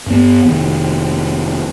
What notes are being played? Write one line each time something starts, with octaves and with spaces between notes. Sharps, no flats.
G2 B3
F1 D#3